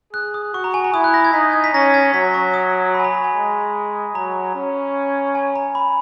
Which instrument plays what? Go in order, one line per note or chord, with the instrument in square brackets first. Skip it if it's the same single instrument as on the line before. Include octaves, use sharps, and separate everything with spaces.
[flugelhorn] G#4 [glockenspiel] F#6
[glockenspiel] D#6
[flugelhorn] F#4 [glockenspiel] C#6
[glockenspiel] A#5
G#5
A#5
[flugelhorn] E4 [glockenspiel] D#6
[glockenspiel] F#6
A#6
G#6
[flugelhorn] D#4 [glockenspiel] B6
[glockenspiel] G#6
B6
[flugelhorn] C#4 [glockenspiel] A#6
[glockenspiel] G#6
[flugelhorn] F#3 [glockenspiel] B6
[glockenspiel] C#6
D#6
C#6
B5
G#5
A#5
A#5
G#5
[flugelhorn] G#3
[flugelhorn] F#3 [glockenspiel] A#5
[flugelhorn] C#4
[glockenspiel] G#5
A#5
B5